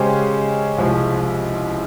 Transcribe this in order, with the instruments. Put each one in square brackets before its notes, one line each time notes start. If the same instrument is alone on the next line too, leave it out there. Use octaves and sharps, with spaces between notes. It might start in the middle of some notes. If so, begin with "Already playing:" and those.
Already playing: [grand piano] C#3 G#3 C#4 G4 C5
C2 C3 F3 G#3